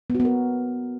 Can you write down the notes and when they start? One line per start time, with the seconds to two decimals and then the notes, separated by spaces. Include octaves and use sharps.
0.10 B3
0.15 F#4
0.20 B3
0.25 A#4